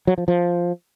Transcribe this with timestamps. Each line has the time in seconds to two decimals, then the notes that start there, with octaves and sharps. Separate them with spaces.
0.07 F#3
0.18 F3
0.28 F3